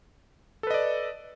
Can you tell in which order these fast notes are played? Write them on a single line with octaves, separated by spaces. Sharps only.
A4 B4 D#5 D5